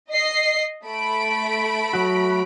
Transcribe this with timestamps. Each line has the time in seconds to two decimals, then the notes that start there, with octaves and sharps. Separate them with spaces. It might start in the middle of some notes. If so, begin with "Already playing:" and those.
0.10 D#5 C7
0.84 A3 B5 D7
1.93 F#3 F#4